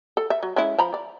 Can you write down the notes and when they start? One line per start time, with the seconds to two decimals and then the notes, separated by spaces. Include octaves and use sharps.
0.17 A4
0.30 E5
0.43 F#3
0.56 G#3 C#4 E4
0.79 F3 A#5 B5
0.94 D5